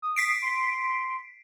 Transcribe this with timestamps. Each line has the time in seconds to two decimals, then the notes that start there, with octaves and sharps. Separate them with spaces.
0.02 D#6
0.16 B6 C7 D7
0.42 C6